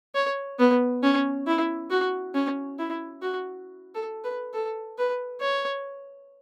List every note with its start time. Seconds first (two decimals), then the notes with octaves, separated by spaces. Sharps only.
0.15 C#5
0.59 B3
1.03 C#4
1.47 E4
1.90 F#4
2.35 C#4
2.79 E4
3.22 F#4
3.95 A4
4.24 B4
4.54 A4
4.98 B4
5.41 C#5